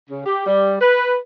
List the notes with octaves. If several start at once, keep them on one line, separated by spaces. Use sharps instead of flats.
C#3
G4
G3
B4